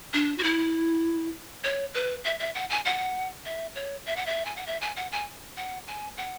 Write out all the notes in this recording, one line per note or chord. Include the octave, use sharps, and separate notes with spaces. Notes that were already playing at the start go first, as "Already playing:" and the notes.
D4
F#4
E4
C#5
B4
E5
E5
F#5
G#5
F#5
E5
C#5
E5
F#5
E5
G#5
F#5
E5
G#5
F#5
G#5
F#5
G#5
F#5